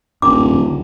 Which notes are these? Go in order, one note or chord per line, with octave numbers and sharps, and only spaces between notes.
D#1 A1 F#2 D4 D6
C#2 F#2 D3